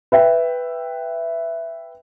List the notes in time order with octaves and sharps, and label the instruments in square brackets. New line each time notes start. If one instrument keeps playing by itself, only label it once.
[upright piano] B4 E5 G5